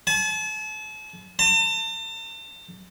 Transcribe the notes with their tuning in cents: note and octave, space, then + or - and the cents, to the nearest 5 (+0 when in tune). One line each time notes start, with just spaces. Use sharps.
A5 -40
A5 +40